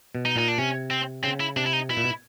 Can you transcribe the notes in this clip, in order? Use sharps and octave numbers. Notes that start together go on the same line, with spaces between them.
B2
D#4
A#2 D#4
D4
C3 C#4
C4
C#3 C4
E4
C3 D4
E4
D#4
B2 E4
A#2
B2